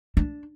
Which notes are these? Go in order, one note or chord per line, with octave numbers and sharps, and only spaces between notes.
D4